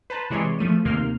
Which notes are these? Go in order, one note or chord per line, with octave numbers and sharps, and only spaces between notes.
B4 C5 A5 A#5 F#6
C3 E3 G#3 C#5 D5 C6
F3 A3 D#7
D#2 C3 A#3 C6 F6